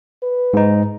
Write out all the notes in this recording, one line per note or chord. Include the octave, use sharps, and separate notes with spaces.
B4
G#2 D#4